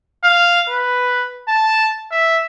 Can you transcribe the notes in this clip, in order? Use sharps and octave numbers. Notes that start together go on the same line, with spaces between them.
F5
B4
A5
E5